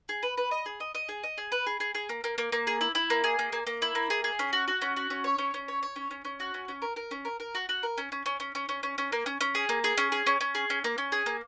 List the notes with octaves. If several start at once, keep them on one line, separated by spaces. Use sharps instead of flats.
G#4
B4
B4
D#5
G#4
D#5
D#5
G#4
D#5
G#4
B4
G#4
G#4
G#4
A#3
A#3
A#3
A#3
G#4
E4
E4
A#3
G#4
A#3
A#3
A#3
E4
A#3
G#4
G#4
C#4
F#4
F#4
C#4
F#4
C#4
C#5
C#4
C#4
C#5
C#5
C#4
C#4
C#4
F#4
C#4
C#4
A#4
A#4
C#4
A#4
A#4
F#4
F#4
A#4
C#4
C#4
C#4
C#4
C#4
C#4
C#4
C#4
A#3
C#4
C#4
G#4
A#3
G#4
C#4
G#4
C#4
C#4
G#4
C#4
A#3
C#4
G#4
A#3